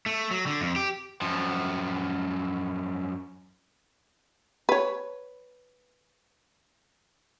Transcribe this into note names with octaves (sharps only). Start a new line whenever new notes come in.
A3
F#3
D3
F2
G4
F#2 F3
B4 C#5